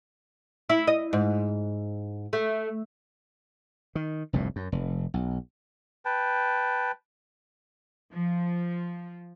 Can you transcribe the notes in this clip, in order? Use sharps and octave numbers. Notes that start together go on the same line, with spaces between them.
E4
D#5
G#2
A3
D#3
F1 C2 G2 A#2
F#2
F1
B1
B4 G5 A5
F3